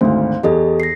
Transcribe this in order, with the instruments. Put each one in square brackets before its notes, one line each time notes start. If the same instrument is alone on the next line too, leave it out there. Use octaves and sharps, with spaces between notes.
[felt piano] G#1 D2 [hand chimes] C5 F5
[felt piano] E2 [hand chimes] G4 A4 D#5
[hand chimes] A#6 C7